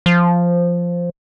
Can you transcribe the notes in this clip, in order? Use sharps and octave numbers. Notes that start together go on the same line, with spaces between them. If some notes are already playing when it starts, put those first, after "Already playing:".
F3